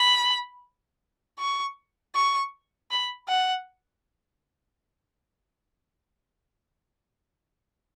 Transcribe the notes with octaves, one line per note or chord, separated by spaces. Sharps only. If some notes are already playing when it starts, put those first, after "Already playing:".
Already playing: B5
C#6
C#6
B5
F#5